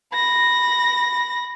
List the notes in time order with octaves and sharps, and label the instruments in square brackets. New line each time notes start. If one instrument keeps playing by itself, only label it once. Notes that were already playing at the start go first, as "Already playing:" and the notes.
[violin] B5 A#6